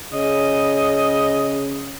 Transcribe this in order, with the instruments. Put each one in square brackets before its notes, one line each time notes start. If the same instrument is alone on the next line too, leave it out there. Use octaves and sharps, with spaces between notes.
[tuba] C#3 [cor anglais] D#5